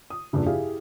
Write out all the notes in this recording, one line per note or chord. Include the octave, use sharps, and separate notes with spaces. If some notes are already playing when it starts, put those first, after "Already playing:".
D#6
F1 A#1 G2 C#3
E4 G4 G#4 F5